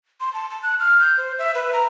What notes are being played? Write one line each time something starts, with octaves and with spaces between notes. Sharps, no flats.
C6
A5
A5
F#6
F6
G6
C5
E5
B4
A#5